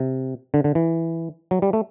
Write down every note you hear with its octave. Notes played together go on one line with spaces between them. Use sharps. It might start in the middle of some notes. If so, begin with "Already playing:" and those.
Already playing: C3
D3
D3
E3
F#3
G3
A3